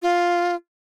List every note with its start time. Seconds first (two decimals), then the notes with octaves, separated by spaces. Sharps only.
0.02 F4